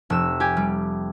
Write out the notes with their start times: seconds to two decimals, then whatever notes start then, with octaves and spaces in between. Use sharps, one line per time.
0.10 F1 E6
0.40 G4 G#5
0.57 G3